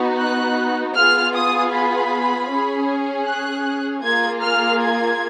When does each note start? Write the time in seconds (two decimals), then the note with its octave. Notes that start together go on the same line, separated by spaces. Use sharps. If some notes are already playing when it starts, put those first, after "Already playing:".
Already playing: B3 D#4 F#4
0.18 F#6
0.94 B3 F4 G#4 F6
1.34 D#6
1.72 B5
2.48 C#4 G#4
3.26 F#6
4.03 A#3 F4 G#4 G#6
4.41 F6
4.80 G#6